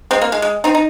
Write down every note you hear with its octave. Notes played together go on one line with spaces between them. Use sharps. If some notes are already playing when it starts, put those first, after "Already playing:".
G#3 C4
A#3
G#3
G#3
C4 D#4
D#4